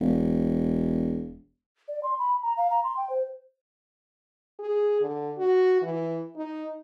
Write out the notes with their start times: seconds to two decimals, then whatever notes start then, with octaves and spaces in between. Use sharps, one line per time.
0.01 E1
1.88 D5
2.03 C6
2.19 B5
2.43 A#5
2.57 F5
2.70 A#5
2.84 C6
2.97 G5
3.10 C5
4.59 G#4
5.01 D3
5.38 F#4
5.82 E3
6.36 D#4